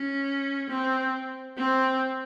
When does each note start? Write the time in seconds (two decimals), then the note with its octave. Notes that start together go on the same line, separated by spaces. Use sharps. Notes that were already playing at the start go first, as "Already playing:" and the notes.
Already playing: C#4
0.69 C4
1.57 C4